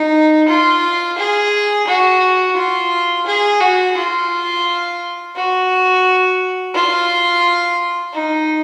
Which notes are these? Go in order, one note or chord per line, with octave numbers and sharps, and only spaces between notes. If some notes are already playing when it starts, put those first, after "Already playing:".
Already playing: D#4
F4
G#4
F#4
F4
G#4
F#4
F4
F#4
F4
D#4